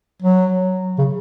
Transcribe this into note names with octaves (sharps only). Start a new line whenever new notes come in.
F#3
C#3